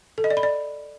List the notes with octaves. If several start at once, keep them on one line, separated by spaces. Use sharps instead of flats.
A4
D#5
D5
B5
D5